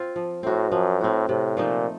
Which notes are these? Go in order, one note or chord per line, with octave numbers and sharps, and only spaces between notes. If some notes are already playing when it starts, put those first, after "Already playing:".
Already playing: C4 F4
F3
A2 C4 F#4
F#2 F3
A2 C4 F#4
A2 C3
A#2 F3 A3 D#4